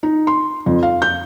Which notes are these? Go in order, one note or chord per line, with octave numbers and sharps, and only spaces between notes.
D#4
C6
F2
F5
G6